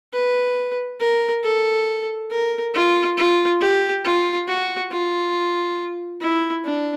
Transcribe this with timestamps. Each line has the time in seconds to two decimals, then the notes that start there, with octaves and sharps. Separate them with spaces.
0.13 B4
1.00 A#4
1.44 A4
2.31 A#4
2.75 F4
3.17 F4
3.60 G4
4.05 F4
4.48 F#4
4.91 F4
6.22 E4
6.65 D4